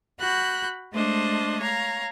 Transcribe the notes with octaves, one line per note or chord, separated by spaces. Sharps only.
F#4 B5 F#6 G6
G#3 A3 D4 C5 D#5
C#5 F5 A#5